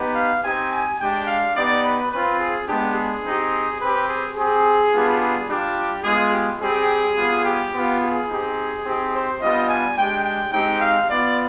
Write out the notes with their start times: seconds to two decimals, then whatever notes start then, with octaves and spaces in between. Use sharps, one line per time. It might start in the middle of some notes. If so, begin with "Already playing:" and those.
Already playing: B3 D#4 G4
0.15 F5
0.43 C4 D#4 G4 G#5
0.72 G#5
1.00 G#3 D4 G4 G5
1.27 F5
1.56 B3 D#4 G4 D5
1.84 B4
2.11 C4 F4 B4
2.40 G#4
2.68 G#3 B3 D4 G4
2.95 G#4
3.24 C4 D#4 G4
3.80 C4 G4 B4
4.08 G#4
4.36 C4 G4 G#4
4.93 G3 B3 D4 F4
5.21 G#4
5.48 G3 D4 F4 G4
6.04 G#3 B3 F4 G#4
6.32 G4
6.61 G3 C4 G4 G#4
7.16 G3 B3 F4
7.45 G4
7.72 B3
7.77 F4
8.01 G#4
8.29 C4 D#4 G4
8.85 C4 D#4 G4
9.13 C5
9.40 G3 B3 D4 F4 D#5
9.69 G#5
9.97 G#3 D4 G4 G5
10.25 G5
10.53 G#3 C4 D#4 G4 G5
10.81 F5
11.09 B3 F4 D5